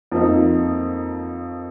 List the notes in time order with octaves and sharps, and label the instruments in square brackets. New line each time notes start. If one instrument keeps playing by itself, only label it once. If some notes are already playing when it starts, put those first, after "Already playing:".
[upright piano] F2 F3 A#3 D#4